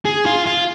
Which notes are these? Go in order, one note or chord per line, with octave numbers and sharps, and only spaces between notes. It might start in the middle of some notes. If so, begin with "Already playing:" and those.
G#4
F4
F4